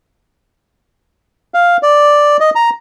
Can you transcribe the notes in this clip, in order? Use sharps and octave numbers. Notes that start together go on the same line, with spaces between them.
F5
D5
D#5
A#5